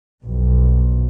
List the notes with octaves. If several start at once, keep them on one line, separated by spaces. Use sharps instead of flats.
B1 F2